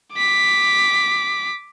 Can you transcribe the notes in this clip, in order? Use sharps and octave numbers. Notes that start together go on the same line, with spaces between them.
D6 B6